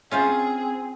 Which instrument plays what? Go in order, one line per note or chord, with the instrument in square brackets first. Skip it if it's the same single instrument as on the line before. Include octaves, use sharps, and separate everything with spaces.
[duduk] C4 [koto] C#4 F4 C5 [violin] G#4